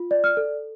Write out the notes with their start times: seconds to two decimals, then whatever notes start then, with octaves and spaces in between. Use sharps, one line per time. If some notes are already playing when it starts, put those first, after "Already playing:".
Already playing: F4
0.11 D5
0.24 F6
0.37 A4